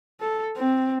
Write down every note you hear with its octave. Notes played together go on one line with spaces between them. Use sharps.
A4
C4